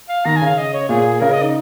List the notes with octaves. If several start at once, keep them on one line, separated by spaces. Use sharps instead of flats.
F5
D#3 A#5
G#5
C#3 F5
D#5
C#5
A#2 G#4
C#3 A#4
D#5
D#4